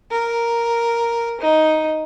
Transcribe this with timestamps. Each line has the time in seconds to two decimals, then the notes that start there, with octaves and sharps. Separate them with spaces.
0.11 A#4
1.40 D#4